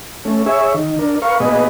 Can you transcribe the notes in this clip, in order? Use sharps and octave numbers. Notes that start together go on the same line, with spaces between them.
A3 C#4
G#4 C#5 E5
D#3
D4 A#4
A#4 B4 F5 C#6
A#2 B3 G#4 B4 D#5